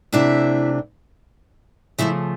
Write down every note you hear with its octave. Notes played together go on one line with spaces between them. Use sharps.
C3 E3 A3 D4 E4 E5
C#3 F3 A3 E4 E5